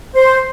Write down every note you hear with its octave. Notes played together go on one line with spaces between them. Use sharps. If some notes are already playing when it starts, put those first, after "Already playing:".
C5